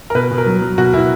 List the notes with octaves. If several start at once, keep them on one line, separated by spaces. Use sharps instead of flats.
A#4
B2 B4
B2
A#4
F#3
F#3
B2 F#4
B2 E4